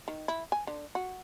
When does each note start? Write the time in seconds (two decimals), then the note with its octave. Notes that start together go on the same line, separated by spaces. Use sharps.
0.08 D#3
0.28 E4
0.52 G#5
0.67 D3
0.95 F#4